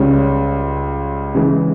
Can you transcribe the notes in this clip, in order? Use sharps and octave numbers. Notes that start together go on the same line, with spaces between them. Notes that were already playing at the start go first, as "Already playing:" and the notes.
Already playing: C#2 C#3 G3 C#4
C#3 E3 G#3